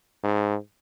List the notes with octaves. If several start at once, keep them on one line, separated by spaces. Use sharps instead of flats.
G#2